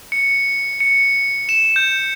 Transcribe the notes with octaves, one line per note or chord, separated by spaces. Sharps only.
C#7
C#7
E7
G6